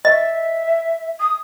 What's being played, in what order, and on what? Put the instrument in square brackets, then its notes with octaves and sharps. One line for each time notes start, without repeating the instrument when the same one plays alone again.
[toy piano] D#5 [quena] E5
[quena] D#6